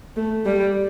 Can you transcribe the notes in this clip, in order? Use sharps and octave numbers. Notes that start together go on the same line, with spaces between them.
A3
G3